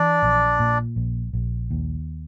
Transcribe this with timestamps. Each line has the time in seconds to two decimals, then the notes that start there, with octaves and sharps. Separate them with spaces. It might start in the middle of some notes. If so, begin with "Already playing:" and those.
Already playing: E3 D4 D5
0.22 A#1
0.59 A#2
0.96 A#1
1.33 A#1
1.71 D#2